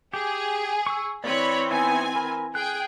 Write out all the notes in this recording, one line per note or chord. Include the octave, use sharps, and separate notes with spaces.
G4 G#4
C#6 E6
E3 C4 C#5 D5 B5
B3 D#4 E4 G#5
A#4 B5
G#4 G5 F#6